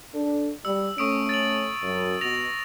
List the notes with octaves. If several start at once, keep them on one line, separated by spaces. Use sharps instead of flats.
D4 A4
G3 E6
A3 C#4 C#6 D#6 D7
A6 F#7
F#2
B2 A#6 F7